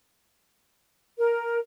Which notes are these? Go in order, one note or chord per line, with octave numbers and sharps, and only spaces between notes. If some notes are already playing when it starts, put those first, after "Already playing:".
A#4